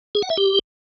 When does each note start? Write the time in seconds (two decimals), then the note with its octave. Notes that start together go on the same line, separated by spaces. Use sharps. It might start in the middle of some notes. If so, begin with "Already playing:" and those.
0.15 G#4
0.22 F#5
0.30 E5
0.37 G4